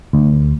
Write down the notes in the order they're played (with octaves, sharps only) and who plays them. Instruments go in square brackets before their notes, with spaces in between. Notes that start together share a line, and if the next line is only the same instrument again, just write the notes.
[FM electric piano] D2